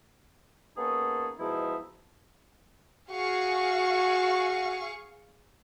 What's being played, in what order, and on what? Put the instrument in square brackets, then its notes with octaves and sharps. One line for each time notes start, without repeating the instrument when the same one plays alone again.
[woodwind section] A#3 B3 C#4 D#4 G#4 A4
G#2 B2 F3 D#4 E4
[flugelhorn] F#4 [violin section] G#4 F5 C#6